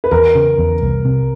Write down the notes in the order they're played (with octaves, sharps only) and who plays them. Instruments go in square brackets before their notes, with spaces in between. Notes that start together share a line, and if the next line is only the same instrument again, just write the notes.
[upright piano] B4
[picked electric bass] E2 [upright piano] A#4
[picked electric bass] C#3
E2
C2
C3